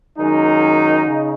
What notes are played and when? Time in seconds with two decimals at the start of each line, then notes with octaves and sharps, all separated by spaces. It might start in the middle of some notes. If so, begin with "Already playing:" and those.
0.18 F#2 D#3 G#3 D#4
1.06 C#3